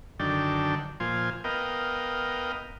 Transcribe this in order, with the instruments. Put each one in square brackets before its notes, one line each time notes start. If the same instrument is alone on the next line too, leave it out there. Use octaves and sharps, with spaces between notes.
[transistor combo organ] F#2 D3 D#3 D4 A4 G5
A#2 F3 F4 C5 G#5
B3 A#4 D#5 F5 G5